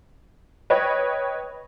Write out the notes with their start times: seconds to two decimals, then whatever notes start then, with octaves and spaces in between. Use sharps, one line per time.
0.70 B4 C#5 D#5 G5